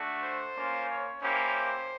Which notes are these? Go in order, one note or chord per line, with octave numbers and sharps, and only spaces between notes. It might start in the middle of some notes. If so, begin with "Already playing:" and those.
Already playing: A3 D4 F#4
C5
A#3 C#4 F4
C#5
A#3 C#4 E4 G4 C5